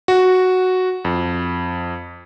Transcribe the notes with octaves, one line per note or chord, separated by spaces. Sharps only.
F#4
F2